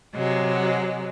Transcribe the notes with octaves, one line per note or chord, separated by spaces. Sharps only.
C3 F#3 G#3